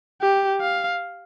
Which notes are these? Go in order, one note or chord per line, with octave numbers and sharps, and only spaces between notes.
G4
F5